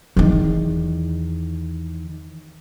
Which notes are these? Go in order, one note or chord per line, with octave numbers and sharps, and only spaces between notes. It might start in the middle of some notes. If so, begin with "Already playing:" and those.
E2 D#3